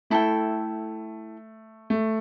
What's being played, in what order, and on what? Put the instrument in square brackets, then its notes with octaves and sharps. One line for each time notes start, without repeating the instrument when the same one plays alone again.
[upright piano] A3 [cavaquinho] E4 A4 G5
[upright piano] A3